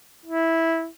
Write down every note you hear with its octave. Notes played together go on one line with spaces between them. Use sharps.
E4